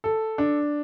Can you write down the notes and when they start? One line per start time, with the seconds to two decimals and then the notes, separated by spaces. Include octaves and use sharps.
0.04 A4
0.38 D4